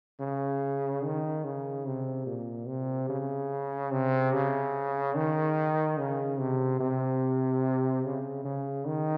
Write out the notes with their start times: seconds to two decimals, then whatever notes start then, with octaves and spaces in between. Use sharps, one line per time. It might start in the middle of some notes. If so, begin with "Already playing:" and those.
0.20 C#3
1.03 D#3
1.44 C#3
1.86 C3
2.26 A#2
2.68 C3
3.09 C#3
3.91 C3
4.33 C#3
5.15 D#3
5.98 C#3
6.38 C3
6.80 C3
8.04 C#3
8.45 C#3
8.87 D#3